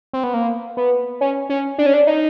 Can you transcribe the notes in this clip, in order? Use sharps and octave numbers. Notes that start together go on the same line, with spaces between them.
C4
B3
A#3
B3
C#4
C#4
D4
C#4
D4
D#4